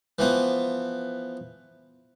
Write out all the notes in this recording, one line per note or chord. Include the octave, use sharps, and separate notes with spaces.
E3 F3 B3